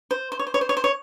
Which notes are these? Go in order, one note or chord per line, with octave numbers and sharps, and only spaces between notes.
C5
C5
C#5
C5
C#5
C5
C#5
C5
C#5